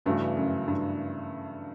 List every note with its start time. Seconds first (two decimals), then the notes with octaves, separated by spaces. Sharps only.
0.06 G2 C#3 E3 A3 D4 F#4
0.37 F#2
0.68 G2